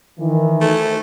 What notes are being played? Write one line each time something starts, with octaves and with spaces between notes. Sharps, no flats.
D#3 E3
A3